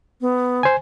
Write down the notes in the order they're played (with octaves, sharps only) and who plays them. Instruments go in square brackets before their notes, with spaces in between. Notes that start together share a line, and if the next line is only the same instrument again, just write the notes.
[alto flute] B3
[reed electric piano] C5 G#5